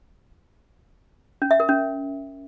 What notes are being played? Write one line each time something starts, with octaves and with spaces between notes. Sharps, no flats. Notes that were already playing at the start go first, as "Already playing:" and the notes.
C#4
E5
A#4
C#4